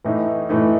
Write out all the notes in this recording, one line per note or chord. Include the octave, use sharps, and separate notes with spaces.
A2 E3 A3 D#4
A2 E3 A3 D#4